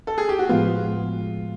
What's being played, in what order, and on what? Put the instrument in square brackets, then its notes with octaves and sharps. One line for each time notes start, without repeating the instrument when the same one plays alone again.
[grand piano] A4
G#4
G4
F#4
[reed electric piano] A2 F3 G#3 B3 [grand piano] F4